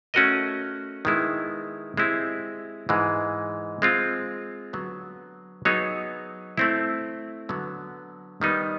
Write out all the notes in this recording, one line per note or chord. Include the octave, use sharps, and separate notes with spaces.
A3 C#4 F#4 A#4 D#5
D#3 G#3 B3 E4
G#3 C4 E4 G4
G#2 E3 G#3
G#3 C4 F4
D3 F#3 B3
F#3 B3 D#4 G#4 C#5
A3 C4 E4
D3 F#3 B3
D#3 G3 B3 D#4